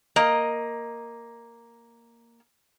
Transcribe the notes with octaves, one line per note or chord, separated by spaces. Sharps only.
A#3 D#5